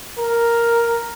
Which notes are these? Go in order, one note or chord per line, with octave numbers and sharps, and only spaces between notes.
A#4